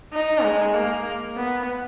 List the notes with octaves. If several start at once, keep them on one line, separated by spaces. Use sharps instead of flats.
D#4
G#3
A#3
B3